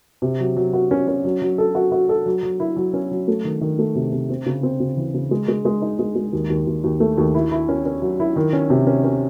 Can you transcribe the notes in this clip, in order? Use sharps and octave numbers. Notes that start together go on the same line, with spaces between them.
C3
F#3
F#3
F#4
C#4
C#4
F#3
F#3
A4
F#4
F#4
A4
F#3
F#3
E4
F#3
C#4
F#3
A3
D#3
D#3
A3
C3
C3
C4
C#3
C4
C#3
E3
C#3
G#3
G#3
G#3
D#4
G#3
G#3
D#2
D#2
D#2
D#2
A3
D#2
E4
E4
C#4
C#4
F#3
E4
D#3
C#4
C3
C#4
C#4